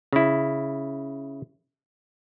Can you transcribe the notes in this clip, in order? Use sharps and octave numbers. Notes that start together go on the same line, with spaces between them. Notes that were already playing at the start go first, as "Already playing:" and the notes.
C#3 E4